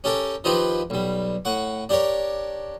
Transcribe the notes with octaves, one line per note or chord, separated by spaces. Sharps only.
C#4 G4 A4 A#4
D#3 F3 D#4 F4 G4 B4
B1 G3
A2 F#5 C#6
D4 G4 A#4 C#5